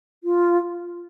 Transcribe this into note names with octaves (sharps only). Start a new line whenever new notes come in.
F4